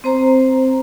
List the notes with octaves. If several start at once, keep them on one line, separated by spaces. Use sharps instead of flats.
C4 C5 A#5